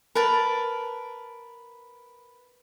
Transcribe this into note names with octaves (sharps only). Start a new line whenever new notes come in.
A#4 B4 A5